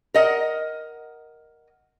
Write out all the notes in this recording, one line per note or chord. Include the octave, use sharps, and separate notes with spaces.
A#4 D#5 F#5